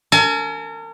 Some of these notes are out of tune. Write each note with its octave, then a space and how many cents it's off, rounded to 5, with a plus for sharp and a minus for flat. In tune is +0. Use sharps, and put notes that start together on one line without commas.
A#4 -40 G#5 +35